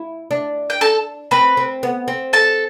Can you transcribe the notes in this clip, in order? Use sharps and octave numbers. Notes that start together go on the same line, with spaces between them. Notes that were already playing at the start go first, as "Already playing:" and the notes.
Already playing: E4
D4
G5
A4 A5
C4 B4 B5
C4
B3
C4
A4 A5